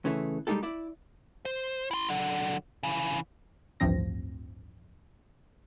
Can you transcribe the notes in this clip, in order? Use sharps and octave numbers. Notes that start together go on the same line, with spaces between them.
C#3 E3 A3
G3 G#3 A#3 D#4 G4 A4
E4 D5
C5
E4 C6
D3 F#3
C#3 E3
A1 D2 G2 F3 C4 A#6